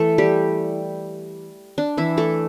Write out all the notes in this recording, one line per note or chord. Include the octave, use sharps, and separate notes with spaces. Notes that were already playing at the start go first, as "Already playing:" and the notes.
Already playing: E3 A3 E4 A4
G3 G4
D4
E3 E4
A3 A4